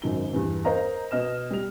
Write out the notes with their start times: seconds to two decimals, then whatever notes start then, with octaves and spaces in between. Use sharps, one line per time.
0.02 G#1 F#2 D#4 G7
0.33 E2 G2
0.65 A#4 C5 D#5 F5 A#5
1.11 B2 D#5 F6 E7
1.51 G3 F7